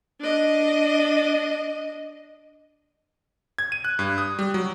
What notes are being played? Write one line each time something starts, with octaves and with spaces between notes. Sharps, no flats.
D4 D#5
G#6
D#7
F#6
G2
D#6
G3
F#3